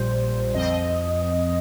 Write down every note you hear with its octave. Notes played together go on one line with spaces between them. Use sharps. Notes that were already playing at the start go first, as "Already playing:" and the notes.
Already playing: A#1 A#2 G3 C5
F2 F3 C4 D#5